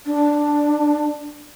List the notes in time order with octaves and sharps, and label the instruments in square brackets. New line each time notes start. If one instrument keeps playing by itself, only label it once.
[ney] D4